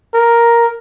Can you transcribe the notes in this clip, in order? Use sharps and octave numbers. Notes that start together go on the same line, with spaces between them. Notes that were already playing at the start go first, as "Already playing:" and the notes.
A#4